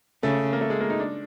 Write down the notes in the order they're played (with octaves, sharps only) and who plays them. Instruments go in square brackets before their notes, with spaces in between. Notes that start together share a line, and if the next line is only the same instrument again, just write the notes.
[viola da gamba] C#3 [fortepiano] A3
[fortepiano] A#3
A3
G#3
A#3
D#4
D4